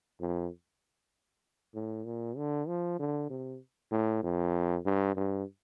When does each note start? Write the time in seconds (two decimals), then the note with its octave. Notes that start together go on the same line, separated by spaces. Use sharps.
0.21 F2
1.75 A2
2.06 A#2
2.37 D3
2.68 F3
2.99 D3
3.30 C3
3.92 A2
4.23 F2
4.85 G2
5.16 G2